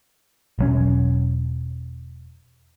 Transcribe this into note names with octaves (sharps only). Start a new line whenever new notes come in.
E1 F#3 C#4